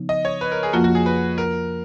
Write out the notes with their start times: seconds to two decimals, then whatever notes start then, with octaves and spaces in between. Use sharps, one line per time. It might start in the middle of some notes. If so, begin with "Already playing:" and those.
Already playing: C#3 F3 B3 D#4
0.09 D#5
0.25 C#5
0.41 B4
0.52 A#4
0.63 G#4
0.73 F2 F3 A#3 F4 F#4
0.84 F#4
0.95 G#4
1.06 B4
1.38 A#4